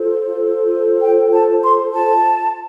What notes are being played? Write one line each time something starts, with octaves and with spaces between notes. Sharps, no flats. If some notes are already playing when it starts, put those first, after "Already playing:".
Already playing: F4 A4 C5
G5
A5
C6
A5